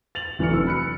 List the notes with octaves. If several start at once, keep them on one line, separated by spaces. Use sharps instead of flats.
A6 F7 F#7
F1 E3 F#3 D4 F6 C#7
E6
B5 F#6 C#7